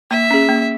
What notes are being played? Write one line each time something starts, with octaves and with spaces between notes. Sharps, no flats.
A#3 E5
C#4 G#4
A#3